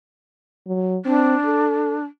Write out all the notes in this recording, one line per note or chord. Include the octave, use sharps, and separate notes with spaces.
F#3
C4 D4
A4